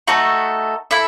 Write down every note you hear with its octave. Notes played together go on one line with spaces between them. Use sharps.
A3 D#4 F#4 A4
E4 A4 E5